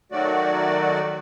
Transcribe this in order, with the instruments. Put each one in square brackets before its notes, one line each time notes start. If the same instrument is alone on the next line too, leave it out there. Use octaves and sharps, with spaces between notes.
[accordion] D#3 F#3 A3 F#4 D5